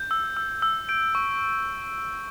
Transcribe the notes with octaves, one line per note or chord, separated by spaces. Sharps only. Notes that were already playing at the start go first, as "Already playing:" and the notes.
Already playing: G6
E6
E6
E6
G6 D7
C#6